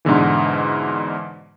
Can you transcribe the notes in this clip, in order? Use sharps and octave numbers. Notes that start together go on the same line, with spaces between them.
G#2 B2 D3 E3